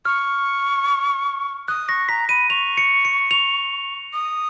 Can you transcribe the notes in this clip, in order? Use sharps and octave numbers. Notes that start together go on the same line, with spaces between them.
C#6 F6
D#6 F#6
C#6 A#6
A#5 B6
B5 D#7
C#6 F7
C#7
C#7
F7
D#6